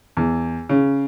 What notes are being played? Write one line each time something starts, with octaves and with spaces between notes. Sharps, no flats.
E2
C#3